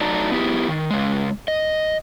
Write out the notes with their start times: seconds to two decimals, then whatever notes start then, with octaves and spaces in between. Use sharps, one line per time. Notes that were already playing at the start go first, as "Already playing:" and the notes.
0.01 F#3 A3 D#4 D5 A5 A#5
0.31 B3 E4 G4 G#4
0.68 D#3
0.91 C#3 G#3
1.48 D#5